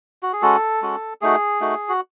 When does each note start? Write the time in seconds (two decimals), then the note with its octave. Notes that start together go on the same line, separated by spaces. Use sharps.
0.23 F#4
0.33 G#4
0.42 G#3 C#4 F#4 A4
0.82 G#3 C#4 F#4
1.21 A3 D#4 F#4 G#4
1.61 A3 D#4 F#4
1.89 F#4